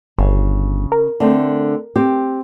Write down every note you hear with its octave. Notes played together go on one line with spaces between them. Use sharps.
G1 C#3
A#4
D3 A3 C4
C4 G4